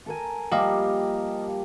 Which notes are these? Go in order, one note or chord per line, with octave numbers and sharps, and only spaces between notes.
A4 A#4 G#5
F3 G3 A#3 G4 D#5 F5